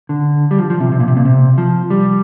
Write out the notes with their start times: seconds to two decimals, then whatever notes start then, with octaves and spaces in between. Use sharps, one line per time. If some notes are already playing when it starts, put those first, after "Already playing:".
0.09 D3
0.51 G3
0.58 F3
0.70 F3
0.80 C3
0.92 C3
1.00 A#2
1.08 C3
1.17 A#2
1.25 C3
1.58 F3
1.90 G3